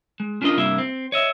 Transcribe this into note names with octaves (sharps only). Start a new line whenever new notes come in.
G#3
C#4 D4 F4 A#4 D#5
G2 C3 G3 A#3 E4 E5
C4
C#5 D#5 E5